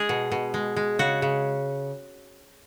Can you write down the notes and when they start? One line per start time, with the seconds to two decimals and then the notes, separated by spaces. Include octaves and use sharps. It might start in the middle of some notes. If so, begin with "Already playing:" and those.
Already playing: G#3 G#4
0.09 B2
0.32 B2
0.54 G#3
0.76 G#3
0.99 C#3 F#4
1.22 C#3